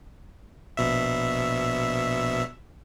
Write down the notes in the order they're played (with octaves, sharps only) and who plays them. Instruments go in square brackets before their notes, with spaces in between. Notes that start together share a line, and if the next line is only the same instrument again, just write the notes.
[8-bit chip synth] A#1 B2 E5